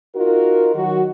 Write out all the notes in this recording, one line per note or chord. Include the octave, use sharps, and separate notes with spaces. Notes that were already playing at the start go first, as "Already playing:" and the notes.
D#4 F4 F#4 A#4
D#3 F#3 F#4